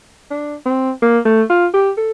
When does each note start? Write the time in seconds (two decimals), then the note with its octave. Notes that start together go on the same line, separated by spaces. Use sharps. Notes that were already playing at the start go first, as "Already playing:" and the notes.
0.31 D4
0.66 C4
1.02 A#3
1.25 A3
1.50 F4
1.74 G4
1.97 A4